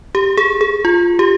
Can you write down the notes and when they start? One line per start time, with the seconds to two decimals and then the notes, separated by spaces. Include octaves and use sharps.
0.15 G4
0.37 G#4
0.61 G#4
0.85 F4
1.19 G4